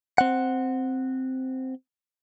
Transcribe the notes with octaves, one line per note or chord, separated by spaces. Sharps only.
C4 F#5